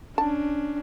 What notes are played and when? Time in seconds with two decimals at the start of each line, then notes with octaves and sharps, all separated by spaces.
0.18 C#4 D4 A5